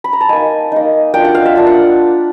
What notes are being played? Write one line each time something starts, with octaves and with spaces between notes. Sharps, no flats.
B5
A#5
A5
A#3 D#4 G#5
A#3 D#4
A#3 D4 F4 G5
F#5
F5
E5
A#3 D4 F4
F#5